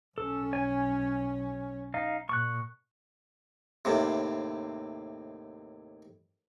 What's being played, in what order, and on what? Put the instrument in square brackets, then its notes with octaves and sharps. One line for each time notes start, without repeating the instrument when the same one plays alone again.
[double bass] B1 C#4 [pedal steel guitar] A4
[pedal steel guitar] C#5 G#5
D#4 F5
[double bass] A#2 [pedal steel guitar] C#6 F#6
[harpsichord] D#2 A2 C3